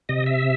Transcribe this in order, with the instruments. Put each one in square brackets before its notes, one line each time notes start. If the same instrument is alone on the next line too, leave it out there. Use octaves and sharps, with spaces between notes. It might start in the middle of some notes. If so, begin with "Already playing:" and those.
[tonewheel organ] C3 D#5
E5